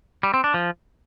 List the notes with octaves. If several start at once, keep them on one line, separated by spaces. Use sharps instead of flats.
G3
C4
D4
F3